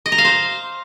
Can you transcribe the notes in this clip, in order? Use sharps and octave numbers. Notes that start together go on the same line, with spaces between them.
D#5
A#5
F5
C5